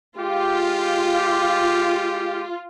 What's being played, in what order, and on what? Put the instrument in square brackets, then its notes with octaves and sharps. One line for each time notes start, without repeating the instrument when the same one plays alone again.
[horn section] G#3 G4 [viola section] F4